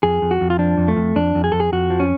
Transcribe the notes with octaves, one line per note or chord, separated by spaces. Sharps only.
F2 G#4
F2
F#4
F2
F4
F3 D4
F2
A3
F2
F2 D4
F2
G#4
F2 A4
G#4
F2 F#4
F3
C#4